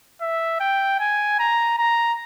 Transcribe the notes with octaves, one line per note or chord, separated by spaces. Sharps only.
E5
G5
G#5
A#5
A#5